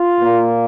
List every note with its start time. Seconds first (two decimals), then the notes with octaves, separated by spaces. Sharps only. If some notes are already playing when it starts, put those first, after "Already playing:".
Already playing: F4
0.18 A#2 A#3